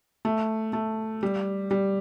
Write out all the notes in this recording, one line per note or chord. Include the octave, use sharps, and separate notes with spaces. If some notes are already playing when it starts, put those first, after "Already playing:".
A3
A3
G3
G3